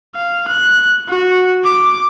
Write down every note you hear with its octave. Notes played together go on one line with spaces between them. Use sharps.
F5
F#6
F#4
D6